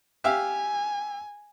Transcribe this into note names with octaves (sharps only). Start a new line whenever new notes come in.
G4 E5 F5 G#5